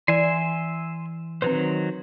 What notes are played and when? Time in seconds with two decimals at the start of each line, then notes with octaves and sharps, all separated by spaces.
0.08 E3 D5 E5 G#5 C6
1.42 D#3 F#3 C4 B4 C5